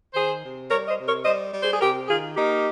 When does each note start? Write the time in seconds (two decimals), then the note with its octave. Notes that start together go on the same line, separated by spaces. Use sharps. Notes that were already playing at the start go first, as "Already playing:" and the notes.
0.14 D#3 G#4 C5
0.42 C3
0.69 G3 A#4 C#5
0.88 C5 D#5
0.97 C3
1.06 A#4 C#5
1.25 G3 C5 D#5
1.52 G3
1.62 G#4 C5
1.74 G#4
1.80 C3 G4 A#4
2.08 D#3 F4 G#4
2.35 A#3 D#4 G4